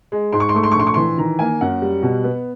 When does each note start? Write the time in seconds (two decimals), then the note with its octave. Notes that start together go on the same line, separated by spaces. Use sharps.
0.12 G#3
0.33 G#2 C6
0.40 C#6
0.49 C6
0.54 A3 C#6
0.63 C6
0.72 C#6
0.76 A#1 C6
0.87 C#6
0.94 E3 C6
1.18 D#3 A#5
1.39 A#3 G#5
1.61 F#2 F#5
1.82 G3
2.02 B2
2.24 B3